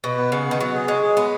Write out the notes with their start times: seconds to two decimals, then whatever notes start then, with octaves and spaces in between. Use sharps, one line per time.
0.04 B2 B4
0.18 B3
0.32 C#3 F#5
0.47 D#3 B3
0.60 F#3 B3
0.74 G#4
0.88 G#3 C#5
1.03 G#4
1.17 G#3 B3